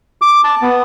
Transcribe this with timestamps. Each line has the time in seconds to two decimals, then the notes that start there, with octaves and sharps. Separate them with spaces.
0.22 D6
0.44 A5
0.62 B3